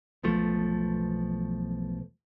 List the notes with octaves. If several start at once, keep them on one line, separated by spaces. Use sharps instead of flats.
E1 B1 F3 A3